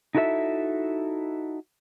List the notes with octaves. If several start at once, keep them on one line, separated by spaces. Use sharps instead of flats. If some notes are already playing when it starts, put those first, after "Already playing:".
D#4 E4 F#4 A4 A#4 E5